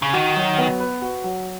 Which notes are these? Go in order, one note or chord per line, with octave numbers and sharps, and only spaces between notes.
C#3
D#3 F#4
F#3
B3
B4
F#4
F#3